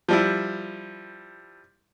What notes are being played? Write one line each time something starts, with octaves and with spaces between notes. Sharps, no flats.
F3 G3 E4